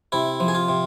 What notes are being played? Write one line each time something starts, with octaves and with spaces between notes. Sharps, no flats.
C3 E4
F3
G#4
F4
C3